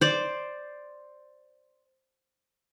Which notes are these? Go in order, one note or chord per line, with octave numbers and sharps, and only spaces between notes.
C5 D5